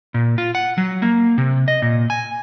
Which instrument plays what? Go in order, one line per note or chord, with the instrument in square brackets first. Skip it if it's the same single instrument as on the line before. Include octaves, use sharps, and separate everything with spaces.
[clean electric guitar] A#2
F4
F#5
F#3
A#3
C3
D#5
A#2
G#5